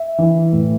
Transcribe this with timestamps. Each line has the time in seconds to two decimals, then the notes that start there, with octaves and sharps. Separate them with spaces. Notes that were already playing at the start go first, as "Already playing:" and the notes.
Already playing: E5
0.18 E3
0.53 A2